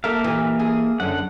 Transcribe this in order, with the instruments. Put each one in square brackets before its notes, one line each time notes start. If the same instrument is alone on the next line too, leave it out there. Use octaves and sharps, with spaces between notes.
[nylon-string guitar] A3 [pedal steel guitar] A#3 E5 F5 [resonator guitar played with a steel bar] A4 A#4
[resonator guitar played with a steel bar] A#2 [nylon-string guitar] E3 G4
[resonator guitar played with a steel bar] G#4
[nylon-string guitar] F#2 D3 [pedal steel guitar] F#5